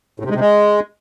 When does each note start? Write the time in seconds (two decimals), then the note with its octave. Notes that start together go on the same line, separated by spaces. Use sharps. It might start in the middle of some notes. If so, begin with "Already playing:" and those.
0.20 A2
0.25 C3
0.30 G#3
0.35 C3
0.40 G#3